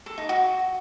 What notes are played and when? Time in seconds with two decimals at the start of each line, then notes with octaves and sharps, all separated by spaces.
0.06 A4
0.18 D#4
0.29 F#4